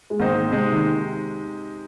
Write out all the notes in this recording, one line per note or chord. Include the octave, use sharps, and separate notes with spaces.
G#3
G#2 D#3 A#3 C4 D#4 C5
C3 G#3 D#4 C5
D#3